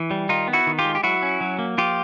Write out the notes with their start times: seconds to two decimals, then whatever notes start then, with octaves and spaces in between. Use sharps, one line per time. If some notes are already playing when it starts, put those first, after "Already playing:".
Already playing: E3
0.11 G3
0.29 D#3 D#4 F4
0.48 B3
0.53 E4 F#4
0.67 D#3
0.79 F4 G4
0.85 G#3
0.95 G4
1.03 F#3 E4 F#4
1.23 C#4
1.41 F#3
1.59 A#3
1.78 F3 F4 G4